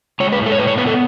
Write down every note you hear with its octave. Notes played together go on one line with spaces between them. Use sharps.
G#3 C#5
B4
A2
A4
C#5
A2 B4
C#5
B3 B4
A4